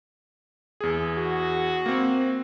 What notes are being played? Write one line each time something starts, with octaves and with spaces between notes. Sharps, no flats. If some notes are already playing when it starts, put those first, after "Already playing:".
E2 G#4
F#4
A#3 C4